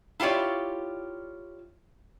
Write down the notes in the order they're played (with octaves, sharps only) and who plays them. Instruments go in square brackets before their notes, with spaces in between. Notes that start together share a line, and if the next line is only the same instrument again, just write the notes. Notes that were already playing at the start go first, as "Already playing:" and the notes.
[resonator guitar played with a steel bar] E4 F4 G4 C#5 D5